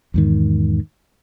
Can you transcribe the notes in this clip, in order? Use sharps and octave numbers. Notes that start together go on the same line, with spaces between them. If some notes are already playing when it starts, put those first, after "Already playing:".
E2 G#2 D#3